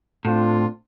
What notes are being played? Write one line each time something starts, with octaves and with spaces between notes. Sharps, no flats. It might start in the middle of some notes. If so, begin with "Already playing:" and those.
A2 C4 D4 F4